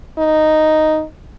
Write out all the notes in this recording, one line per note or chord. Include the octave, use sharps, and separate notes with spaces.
D#4